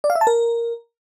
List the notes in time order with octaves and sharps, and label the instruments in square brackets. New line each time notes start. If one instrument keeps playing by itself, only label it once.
[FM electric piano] D5
F5
E5
A5
A#4